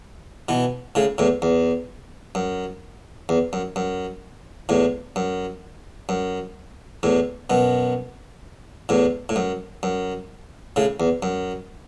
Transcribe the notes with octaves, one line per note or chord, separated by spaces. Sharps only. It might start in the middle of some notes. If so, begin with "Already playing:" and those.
B2 E3
A2 C#3
E2 A2
E2
F#2
E2
F#2
F#2
E2 A2
F#2
F#2
E2 A2
F#2 B2
E2 A2
A2
F#2
F#2
A2 C#3
E2
F#2